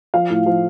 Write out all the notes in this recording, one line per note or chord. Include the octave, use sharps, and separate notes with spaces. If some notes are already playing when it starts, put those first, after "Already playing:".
F3 F5
A2
F3